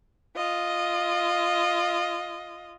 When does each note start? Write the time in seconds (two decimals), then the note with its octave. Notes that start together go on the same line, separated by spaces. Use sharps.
0.36 F4 D#5